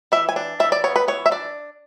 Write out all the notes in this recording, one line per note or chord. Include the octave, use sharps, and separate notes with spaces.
E3 E5
G#5
D4
E3 E5
D5
B3 C#5
B4
E3 C#5
E5
D4 D5